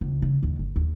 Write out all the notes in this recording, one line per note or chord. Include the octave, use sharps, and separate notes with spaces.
C#2
C#3
D#2 D3
G1
D#2